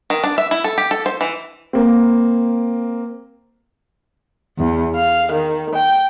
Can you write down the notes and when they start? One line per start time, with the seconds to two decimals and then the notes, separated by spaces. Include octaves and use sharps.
0.10 D#3
0.24 D4
0.38 E5
0.51 E4
0.64 A4
0.78 G4
0.91 A4
1.06 C5
1.21 E3
1.73 A#3 C4
4.58 E2
4.95 F5
5.31 D#3
5.75 G5